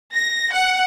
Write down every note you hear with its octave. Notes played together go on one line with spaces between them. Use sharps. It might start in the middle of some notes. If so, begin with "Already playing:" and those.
A#6
F#5